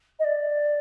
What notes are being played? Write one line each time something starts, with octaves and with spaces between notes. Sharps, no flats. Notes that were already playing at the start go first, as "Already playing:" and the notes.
D#5
D5